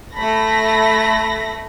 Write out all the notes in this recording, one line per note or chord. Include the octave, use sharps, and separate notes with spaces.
A3 B5 A#6